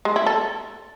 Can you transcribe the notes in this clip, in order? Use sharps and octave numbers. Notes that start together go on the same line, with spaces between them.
G#3
E4
A4